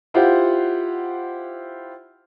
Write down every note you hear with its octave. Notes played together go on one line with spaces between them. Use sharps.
E4 F4 G4 C5 F#5